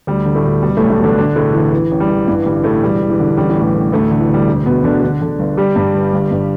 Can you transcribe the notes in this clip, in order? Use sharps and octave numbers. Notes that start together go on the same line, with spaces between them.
D2 G3
D3
A2 A3
D2
B2 G3
B1 A2 A3
A2 A3
B2 D3 D4
D3 D4
E1 A2 A3
D2 E3
E3
A1
G3
A1
G2 E3
G1 G3
A2 E3 A3
E1 G3
E1
E3
D3
A1 G3
E3
A2
G3
A2
D2 A2 A3
D3
E3
D2 G3
E1
E1 B2 B3
E1 D3 D4
D3
D3
G1
G1 G3 G4
G2
G1
G1
G2